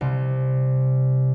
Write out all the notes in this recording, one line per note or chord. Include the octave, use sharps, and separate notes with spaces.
C2 C3